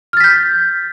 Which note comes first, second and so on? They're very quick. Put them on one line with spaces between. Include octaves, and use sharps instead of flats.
F6 A6 B6 G6